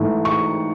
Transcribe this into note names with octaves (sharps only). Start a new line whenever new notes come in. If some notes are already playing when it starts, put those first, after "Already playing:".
Already playing: G#2 E3 A3
C#6